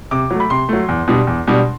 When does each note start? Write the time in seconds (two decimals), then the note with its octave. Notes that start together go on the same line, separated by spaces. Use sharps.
0.11 C3 D6
0.31 F#3 A3
0.40 B5
0.50 C3 C6
0.69 F#3 A3
0.88 E2
1.08 B2 G3 D4
1.27 E2
1.47 B2 G3 D4